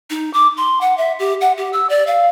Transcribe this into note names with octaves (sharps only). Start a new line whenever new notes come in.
D#4
D6
C6
F#5
E5
G4
F#5
G4
E6
D5
F5